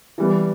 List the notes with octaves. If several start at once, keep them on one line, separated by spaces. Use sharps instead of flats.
E3 G3 B3